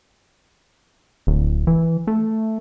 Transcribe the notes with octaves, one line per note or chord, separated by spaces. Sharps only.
D1
E3
A3